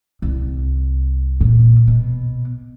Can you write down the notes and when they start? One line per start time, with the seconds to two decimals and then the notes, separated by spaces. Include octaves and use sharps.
0.22 C2
1.41 A#2
1.88 B2